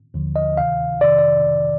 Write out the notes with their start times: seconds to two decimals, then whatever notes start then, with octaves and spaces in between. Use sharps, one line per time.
0.14 D#2 D3 F3
0.36 D#5
0.57 D2 C3 D#3 F5
1.01 F2 C3 D#3 D5
1.19 D5